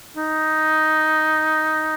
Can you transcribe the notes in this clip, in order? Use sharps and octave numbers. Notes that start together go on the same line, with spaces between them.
D#4